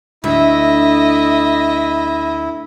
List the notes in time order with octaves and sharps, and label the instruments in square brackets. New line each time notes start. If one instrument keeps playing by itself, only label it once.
[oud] D2 [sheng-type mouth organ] E4 [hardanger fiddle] D#5 E5